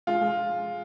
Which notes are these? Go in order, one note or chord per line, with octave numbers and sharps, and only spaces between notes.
G#3 F4
G#3